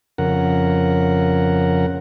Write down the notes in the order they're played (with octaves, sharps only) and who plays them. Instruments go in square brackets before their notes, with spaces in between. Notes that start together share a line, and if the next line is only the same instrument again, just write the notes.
[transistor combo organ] F2 C#3 A#4 F#5